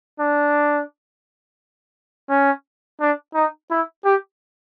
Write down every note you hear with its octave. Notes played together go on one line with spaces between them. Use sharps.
D4
C#4
D4
D#4
E4
G4